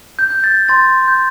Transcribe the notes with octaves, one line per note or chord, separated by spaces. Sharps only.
G6
G6
A6
C6 A6
G6